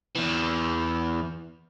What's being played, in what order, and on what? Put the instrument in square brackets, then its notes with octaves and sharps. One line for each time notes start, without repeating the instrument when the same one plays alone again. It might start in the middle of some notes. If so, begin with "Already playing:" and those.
[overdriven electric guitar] E2 E3